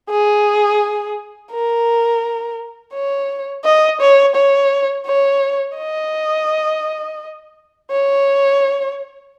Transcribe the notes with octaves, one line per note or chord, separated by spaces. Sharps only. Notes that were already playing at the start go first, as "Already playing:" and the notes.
G#4
A#4
C#5
D#5
C#5
C#5
C#5
D#5
C#5